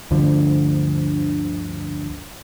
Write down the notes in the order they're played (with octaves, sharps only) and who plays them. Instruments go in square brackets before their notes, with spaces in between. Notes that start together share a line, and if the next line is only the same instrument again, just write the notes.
[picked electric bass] D2 G2 D3 F3